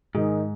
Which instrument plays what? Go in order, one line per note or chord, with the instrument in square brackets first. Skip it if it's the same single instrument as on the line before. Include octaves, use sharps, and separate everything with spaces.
[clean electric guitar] G#2 [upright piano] D#3 G#3 D#4 G#4